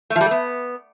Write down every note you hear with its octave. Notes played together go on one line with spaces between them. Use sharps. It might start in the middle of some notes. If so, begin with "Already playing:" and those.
A3
F3
G3
A3
B3